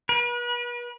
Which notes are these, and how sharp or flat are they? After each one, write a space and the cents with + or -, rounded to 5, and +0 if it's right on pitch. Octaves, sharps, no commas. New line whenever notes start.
B4 -40